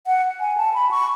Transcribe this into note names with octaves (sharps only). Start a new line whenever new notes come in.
F#5
G#5
A5
B5
C#6